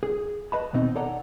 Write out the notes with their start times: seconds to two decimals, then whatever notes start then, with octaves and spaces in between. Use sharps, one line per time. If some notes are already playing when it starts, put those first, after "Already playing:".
0.03 G#4
0.52 B4 D#5 A5 B5
0.73 D#2 B2 C4 D#4
0.96 A4 C#5 D5 F#5 A#5